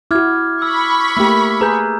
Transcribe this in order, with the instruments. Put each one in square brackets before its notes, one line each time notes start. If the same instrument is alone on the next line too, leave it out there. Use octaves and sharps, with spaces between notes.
[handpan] E4 F#4 [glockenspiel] D6 F6 G#6
[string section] B5 C#6 [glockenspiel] E6
[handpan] A3 A#3 G4 [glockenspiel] E6
[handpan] G#4 B4 [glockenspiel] A#5 G6